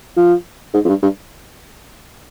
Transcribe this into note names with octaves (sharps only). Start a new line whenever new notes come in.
F3
G#2
F2
G2
G2